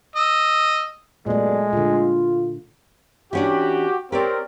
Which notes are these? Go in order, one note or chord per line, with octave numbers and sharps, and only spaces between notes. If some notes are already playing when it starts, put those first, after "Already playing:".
D#5 E6
F#2 A#2 G#3 A3 B3 D5
A#2 D3 F4
E3 C#4 D4 F#4 G4
C4 G4 A#4 C#5 D5